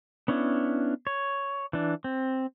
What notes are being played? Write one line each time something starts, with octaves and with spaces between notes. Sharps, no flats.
B3 C#4 D4 E4
C#5
E3 D4
C4